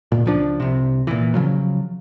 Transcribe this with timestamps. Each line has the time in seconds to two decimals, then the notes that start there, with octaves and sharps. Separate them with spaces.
0.12 A#2
0.26 C#2 F3 D4
0.60 C2 C3
1.07 A#2 E3
1.34 C#3 F3 F#3